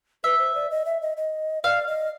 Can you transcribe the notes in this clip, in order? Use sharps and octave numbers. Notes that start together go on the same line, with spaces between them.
B4 E5
C5
D5
D#5
E5
D#5
D#5
D5 F5
D#5